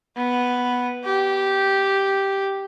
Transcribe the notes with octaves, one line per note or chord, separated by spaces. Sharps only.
B3
G4